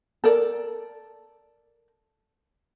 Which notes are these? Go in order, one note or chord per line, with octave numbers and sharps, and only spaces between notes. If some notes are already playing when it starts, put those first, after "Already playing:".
A4 A#4 D5